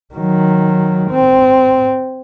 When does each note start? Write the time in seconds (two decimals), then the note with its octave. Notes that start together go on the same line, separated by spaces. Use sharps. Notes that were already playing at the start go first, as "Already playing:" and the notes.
0.14 D#3 F#3
1.10 C4